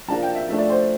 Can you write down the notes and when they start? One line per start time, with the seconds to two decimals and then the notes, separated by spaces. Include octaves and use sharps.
0.08 F3 A#3 D4 F4 A5
0.23 G5
0.35 E5
0.49 F3 A3 D4 E5
0.58 D5
0.69 C5